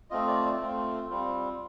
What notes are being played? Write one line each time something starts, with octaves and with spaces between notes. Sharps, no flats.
A3 C4 F4 D#5
D5
A3 C4 F4
G3 C4 F4